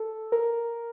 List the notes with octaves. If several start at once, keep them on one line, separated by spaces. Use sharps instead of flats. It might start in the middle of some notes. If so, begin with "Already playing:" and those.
Already playing: A4
A#4